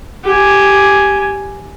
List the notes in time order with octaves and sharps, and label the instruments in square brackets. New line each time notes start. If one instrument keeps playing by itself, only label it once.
[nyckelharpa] G4 G#5